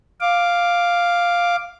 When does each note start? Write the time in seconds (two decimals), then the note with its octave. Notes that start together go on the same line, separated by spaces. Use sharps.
0.20 F5 D6